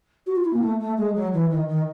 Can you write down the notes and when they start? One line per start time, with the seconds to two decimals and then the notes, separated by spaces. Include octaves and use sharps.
0.26 F#4
0.35 F4
0.44 E4
0.53 A#3
0.61 A3
0.79 A3
0.97 G#3
1.14 F#3
1.32 E3
1.50 D#3
1.68 D#3